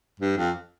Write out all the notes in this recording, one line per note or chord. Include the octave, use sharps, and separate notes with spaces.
G2
F2